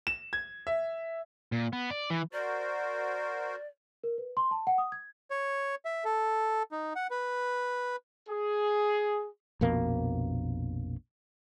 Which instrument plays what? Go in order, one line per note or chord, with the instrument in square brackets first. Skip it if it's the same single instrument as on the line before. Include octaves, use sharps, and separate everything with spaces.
[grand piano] E7
G#6
E5
[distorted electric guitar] A#2
B3
D5
E3
[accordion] F#4 A#4 C5 [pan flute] D5
[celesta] A#4
B4
C6
A5
F#5
D#6
G#6
[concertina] C#5
E5
A4
D#4
F#5
B4
[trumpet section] G#4
[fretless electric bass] A#1 F2 B2 A#3